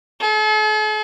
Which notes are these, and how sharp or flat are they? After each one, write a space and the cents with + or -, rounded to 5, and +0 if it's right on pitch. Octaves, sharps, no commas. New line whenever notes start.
A4 -45